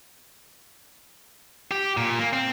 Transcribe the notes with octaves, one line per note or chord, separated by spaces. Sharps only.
G4
A#2
A#3
C4